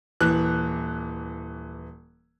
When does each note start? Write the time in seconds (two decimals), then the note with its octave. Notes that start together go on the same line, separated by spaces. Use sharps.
0.21 D#1 E3 F#6